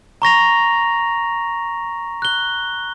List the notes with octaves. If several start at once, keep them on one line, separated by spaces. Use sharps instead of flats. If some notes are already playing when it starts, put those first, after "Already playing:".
A#5 C#6 A#6 F7
F#6 G7